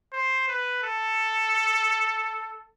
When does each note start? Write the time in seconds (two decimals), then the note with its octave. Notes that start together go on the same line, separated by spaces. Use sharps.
0.13 C5
0.48 B4
0.83 A4